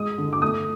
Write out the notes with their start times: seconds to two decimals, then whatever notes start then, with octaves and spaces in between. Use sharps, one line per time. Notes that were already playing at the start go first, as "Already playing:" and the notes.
Already playing: G#3 D#6
0.18 D3
0.33 D6
0.42 A3 D#6